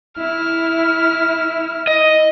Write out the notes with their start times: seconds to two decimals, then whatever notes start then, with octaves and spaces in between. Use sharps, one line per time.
0.21 E4 F6
1.87 D#5